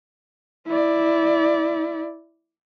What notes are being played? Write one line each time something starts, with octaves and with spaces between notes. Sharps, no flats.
E4 D5